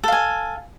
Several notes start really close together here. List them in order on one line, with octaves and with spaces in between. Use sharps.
A4 F5 G#5